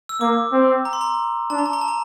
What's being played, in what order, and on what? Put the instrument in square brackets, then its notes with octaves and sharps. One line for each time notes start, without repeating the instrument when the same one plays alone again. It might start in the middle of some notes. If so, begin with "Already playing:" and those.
[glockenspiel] E6
[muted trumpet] A#3 [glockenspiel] D6
[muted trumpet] C4
[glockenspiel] A#5
C6
A#5
[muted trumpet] D4 [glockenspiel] A5
[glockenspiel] A#5
A5
A#5
A5
A#5